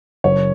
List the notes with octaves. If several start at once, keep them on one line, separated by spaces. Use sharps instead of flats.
F#1 C#5